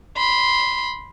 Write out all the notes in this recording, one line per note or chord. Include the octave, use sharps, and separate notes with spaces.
B5 C6